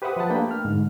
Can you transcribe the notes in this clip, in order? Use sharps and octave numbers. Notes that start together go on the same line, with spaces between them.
G4 B4 C5 E5 F#5 D#6
F3 B4 F#5 A5
A3 A#3 D4 G4 G5 B5
F6
G#2 D3